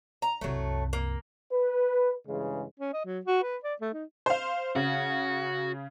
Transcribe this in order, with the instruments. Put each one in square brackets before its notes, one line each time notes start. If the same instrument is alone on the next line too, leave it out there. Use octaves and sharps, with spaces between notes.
[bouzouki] A#5
[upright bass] C2 F#2 [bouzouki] F#3 A3
[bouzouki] A#3
[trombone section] B4
G2 C#3 E3 G#3
[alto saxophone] C#4
D#5
F#3
F#4
B4
D5
A3
D#4
[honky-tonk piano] C5 F5
[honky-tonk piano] C#3 [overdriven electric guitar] F#4